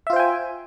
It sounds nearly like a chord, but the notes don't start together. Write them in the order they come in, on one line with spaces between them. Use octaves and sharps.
E5 F4 C5 G5 G#5